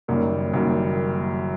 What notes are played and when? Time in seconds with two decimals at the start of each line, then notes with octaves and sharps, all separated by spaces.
0.08 F#1 F#2 D#3 G3 A#3
0.53 F#1 F#2 D#3 G3 A#3